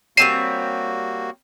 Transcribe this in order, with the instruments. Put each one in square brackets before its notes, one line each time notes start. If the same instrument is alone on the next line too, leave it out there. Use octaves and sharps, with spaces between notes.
[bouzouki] G3 C4 C#5 [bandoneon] A#3 F#4 [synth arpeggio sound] C7 D#7 E7